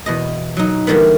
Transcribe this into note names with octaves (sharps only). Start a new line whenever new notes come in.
E2 B2 D#5
F#3 D#4
E2 D3 G3 A#3 B3